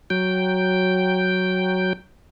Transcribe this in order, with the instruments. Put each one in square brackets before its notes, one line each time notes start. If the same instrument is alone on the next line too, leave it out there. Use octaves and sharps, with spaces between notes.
[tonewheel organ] F#3 G5